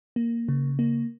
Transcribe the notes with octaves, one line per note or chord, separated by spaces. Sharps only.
A#3
C#3
A#3